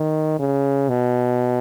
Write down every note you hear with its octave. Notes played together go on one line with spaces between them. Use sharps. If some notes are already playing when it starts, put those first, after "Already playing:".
Already playing: D#3
C#3
B2